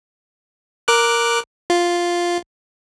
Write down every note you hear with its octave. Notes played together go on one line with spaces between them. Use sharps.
A#4 D6 F#6
F4